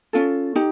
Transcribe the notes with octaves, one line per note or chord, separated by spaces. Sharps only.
C#4 F4 A4
D#4 G4